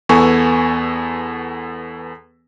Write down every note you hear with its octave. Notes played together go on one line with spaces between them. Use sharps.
E2 B3 A4 G#5 C#6